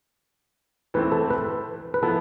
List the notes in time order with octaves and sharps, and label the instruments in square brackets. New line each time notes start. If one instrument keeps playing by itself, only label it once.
[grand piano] E3 A3 C4 [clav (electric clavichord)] B4
[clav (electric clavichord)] A4
B4
B4
[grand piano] F3 B3 E4 [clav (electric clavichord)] A4